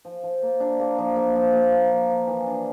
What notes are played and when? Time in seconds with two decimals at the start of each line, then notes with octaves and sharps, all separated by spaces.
0.05 F3
0.23 F3
0.43 A#3
0.60 D4
0.80 A#3
0.98 F3
1.16 A#3
1.35 F3
1.53 A#3
1.72 A#3
1.91 F3
2.10 F3
2.27 E3
2.46 D4